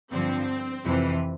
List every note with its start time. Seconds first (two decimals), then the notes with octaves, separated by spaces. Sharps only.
0.11 G2 D3 F3 C4
0.84 F2 C3 E3